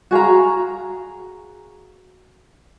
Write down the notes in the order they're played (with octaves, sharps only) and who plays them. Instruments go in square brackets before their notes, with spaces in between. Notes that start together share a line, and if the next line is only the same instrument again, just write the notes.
[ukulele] F#4 G#4 F5 A#5